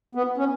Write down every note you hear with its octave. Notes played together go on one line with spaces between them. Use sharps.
B3
C#4